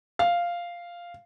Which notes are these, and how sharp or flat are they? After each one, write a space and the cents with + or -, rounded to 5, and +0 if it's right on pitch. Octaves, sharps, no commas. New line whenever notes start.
F5 -5